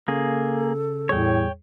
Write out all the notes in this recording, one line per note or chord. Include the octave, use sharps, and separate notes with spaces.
C#3 A#3 G#4 A4
E2 A2 G3 G#4 C#5 G5